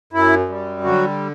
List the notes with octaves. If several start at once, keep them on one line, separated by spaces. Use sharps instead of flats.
F#2 E4
G3
D3 F#3 F#4